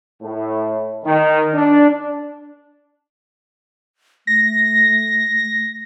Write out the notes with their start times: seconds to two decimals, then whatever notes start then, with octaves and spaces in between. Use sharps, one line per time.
0.22 A2
1.05 D#3
1.54 D4
4.27 A3 A#6